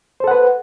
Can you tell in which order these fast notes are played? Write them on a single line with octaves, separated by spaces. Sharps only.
C5 A4 F#5 B4